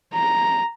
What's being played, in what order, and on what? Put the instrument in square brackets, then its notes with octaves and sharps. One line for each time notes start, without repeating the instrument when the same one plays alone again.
[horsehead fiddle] A#5